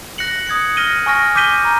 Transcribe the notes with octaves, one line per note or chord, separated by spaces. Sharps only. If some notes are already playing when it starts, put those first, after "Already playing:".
F#6 A#6 C#7 F#7
D#6 G#6 C#7
F6 A#6 D#7 G7
G#5 C#6 F6 A#6
D6 G6 B6 D#7 G7
A#5